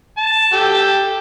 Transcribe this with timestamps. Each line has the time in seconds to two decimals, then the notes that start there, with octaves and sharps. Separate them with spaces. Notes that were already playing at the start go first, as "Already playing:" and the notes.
0.17 A5
0.53 G4 A4